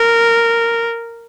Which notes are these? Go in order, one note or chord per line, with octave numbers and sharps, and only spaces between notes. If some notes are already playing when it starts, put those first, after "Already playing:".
Already playing: A#4